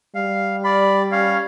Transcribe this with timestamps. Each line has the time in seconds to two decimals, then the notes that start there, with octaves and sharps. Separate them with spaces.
0.15 G3 F5
0.65 D5 B5
1.12 C#4 F5